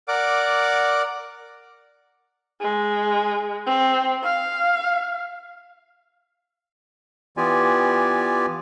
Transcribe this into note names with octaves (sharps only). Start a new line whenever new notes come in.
A#4 D5 F#5 D6
G#3
C4
F5
E3 B3 F4 G4 D5 G#5